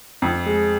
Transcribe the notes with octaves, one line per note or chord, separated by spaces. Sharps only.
F2
G#3